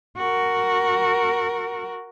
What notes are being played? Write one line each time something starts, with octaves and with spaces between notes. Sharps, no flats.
F#4 A#4